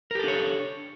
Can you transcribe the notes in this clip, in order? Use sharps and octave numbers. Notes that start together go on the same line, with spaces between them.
D4 G4 A4 A#4 C#5